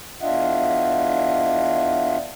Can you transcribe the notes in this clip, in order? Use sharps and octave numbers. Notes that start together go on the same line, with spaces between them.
E2 D4 F4 D#5 E5 F#5